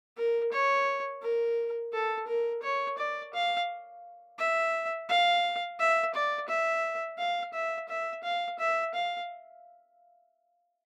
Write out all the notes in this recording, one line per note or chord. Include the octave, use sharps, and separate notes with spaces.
A#4
C#5
A#4
A4
A#4
C#5
D5
F5
E5
F5
E5
D5
E5
F5
E5
E5
F5
E5
F5